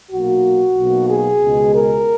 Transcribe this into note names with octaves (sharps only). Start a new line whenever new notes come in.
B1 A#2 A#3 F#4
B1 B2 A#3
G#4
C#2 B2 G#3
A#4